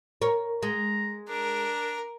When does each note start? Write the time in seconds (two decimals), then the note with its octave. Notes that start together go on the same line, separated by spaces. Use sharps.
0.22 A#4 C#5
0.63 G#3 A#5
1.29 D4 A#4